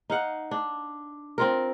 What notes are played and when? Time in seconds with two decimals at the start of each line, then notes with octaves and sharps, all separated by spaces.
0.10 D#4 F5 F#5
0.51 D4
1.38 C4 F4 A#4